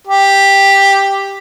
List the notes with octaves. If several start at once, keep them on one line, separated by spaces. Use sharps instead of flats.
G4